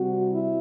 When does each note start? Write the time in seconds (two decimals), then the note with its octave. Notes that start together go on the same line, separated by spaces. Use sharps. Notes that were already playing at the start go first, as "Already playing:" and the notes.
Already playing: C3 G3 C4 F#4
0.31 E4